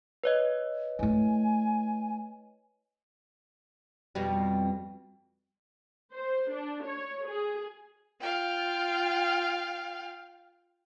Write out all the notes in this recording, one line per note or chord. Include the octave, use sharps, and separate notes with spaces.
B4 C#5 D#5
A3 E4 G#5
F2 B2 G3
C5
D4
C#5
G#4
F4 F5 G5